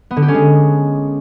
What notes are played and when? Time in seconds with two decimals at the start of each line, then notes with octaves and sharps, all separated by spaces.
0.11 B3
0.16 D3
0.22 G4
0.28 C#4
0.34 G#3